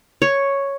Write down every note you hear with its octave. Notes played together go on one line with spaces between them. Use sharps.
C#5